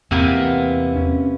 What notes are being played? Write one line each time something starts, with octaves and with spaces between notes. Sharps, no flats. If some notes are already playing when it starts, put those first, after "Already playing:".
E2 C3 A#3 B3
C#4